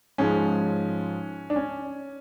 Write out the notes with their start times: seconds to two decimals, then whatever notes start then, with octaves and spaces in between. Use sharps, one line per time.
0.18 G#2 F3 G#3 C#4
1.50 D4
1.56 C#4